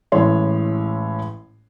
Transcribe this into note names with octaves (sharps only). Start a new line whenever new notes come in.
A1 A2 G#3 C#5 C6